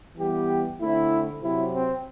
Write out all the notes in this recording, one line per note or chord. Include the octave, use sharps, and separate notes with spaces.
E3 G3 B3 G4
D3 A3 C4 E4
C3 F#3 C4 E4
C4